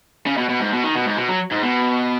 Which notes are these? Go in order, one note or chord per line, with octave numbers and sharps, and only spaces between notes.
C#3
B2
B2
G#2
B2
D#3
B2
G#2
B2
F#3
G#2
B2